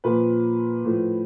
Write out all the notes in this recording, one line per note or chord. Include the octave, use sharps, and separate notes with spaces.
A#2 F3 B4
A2 F3